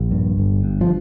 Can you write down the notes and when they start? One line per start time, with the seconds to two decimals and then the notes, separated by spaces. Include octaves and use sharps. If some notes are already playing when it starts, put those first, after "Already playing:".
Already playing: A#1
0.11 G2
0.38 G1
0.64 G2
0.81 F3